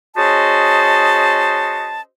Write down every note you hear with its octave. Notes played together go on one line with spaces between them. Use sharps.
C#4 F#4 G#4 C5 D#5 A5